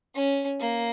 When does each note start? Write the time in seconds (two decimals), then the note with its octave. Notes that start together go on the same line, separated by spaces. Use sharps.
0.15 C#4
0.61 A#3